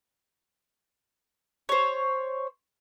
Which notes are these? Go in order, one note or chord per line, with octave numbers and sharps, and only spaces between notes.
C5 C#5